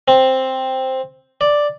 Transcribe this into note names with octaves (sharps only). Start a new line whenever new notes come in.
C4
D5